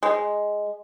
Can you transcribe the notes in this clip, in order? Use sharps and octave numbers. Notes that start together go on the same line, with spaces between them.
G#3